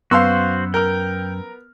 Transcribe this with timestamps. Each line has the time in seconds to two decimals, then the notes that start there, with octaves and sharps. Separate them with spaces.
0.11 F#2 B3 F#4 C5 F5 C6 E6
0.74 A#4 G5 F6